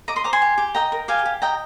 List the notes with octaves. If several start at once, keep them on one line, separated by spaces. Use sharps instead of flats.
D#5 A#5 D6
C6 D#6
C5 A#5 D6
G#5 C6
G4
G4
D#5 G5 A#5
A#4
G4 F5 G#5
G4
D#5 G5 A#5